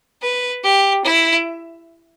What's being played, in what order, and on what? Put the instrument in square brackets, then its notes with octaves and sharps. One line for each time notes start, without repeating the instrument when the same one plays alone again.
[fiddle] B4
G4
E4